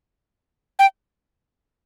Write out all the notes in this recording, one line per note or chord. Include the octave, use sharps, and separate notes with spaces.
G5